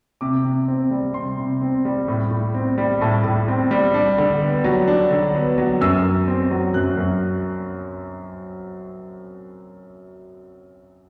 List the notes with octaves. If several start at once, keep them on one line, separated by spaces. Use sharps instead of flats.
C3 D6
C3
C4
G3
C3 C6
C3
C4
G3
A2
A2
C4
G3
A2 A5
A2
C4
G3
D4
D3
B3
F#3
D4
D3
B3
F#3
F#2 E6
F#2
C4
F#3
F#2 F#6
F#2